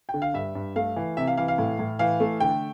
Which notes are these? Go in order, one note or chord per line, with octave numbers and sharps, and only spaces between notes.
G5
D3
F5
G2 E5
G2
A3 F5
E3
C3 E5
F5
E3 F5
F5
A2
A2
E3 F5
A3
D3 G5